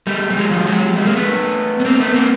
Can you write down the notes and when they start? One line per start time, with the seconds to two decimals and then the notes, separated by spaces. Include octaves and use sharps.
0.07 G3 A3
0.30 G3
0.37 F#3 G#3
0.51 F3 G3
0.67 F#3 G#3
0.96 G3 A3
1.06 G#3 A#3
1.16 A3 B3
1.80 B3
1.85 A#3 C4
2.00 A3 B3
2.14 A#3 C4